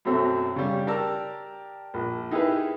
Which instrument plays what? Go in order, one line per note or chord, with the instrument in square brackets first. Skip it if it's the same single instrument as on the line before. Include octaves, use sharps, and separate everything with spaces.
[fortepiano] F#2 B2 A3 C4 F#4
C#3 G3
G4 A#4 D5 A5 A#5 E6
A#1
D#4 E4 G4 G#4 A#4 B4